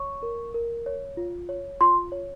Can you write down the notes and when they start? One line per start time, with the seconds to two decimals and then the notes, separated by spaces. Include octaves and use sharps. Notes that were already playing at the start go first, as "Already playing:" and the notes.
Already playing: C#5 C#6
0.23 A#4
0.54 A#4
0.86 C#5
1.17 F4
1.49 C#5
1.81 F4 C6
2.12 C#5